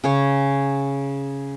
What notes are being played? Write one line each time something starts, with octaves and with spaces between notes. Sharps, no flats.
C#3 C#5